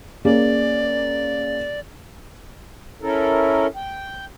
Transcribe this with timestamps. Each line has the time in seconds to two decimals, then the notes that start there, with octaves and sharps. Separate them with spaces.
0.25 A#3 C#4 G#4 D5
3.02 C#4 E4 A4 A#4
3.76 G5